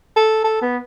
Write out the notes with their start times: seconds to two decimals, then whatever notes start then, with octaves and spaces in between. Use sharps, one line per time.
0.16 A4
0.44 A4
0.62 B3